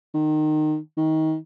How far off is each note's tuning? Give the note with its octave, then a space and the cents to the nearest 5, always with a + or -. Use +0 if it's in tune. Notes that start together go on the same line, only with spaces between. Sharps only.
D#3 -20
D#3 +25